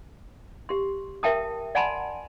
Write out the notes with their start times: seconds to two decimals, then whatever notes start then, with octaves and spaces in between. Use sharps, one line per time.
0.69 G4 C6
1.23 A#4 E5 G5 A5 D#6
1.75 D5 F#5 G#5 A5 B5 C6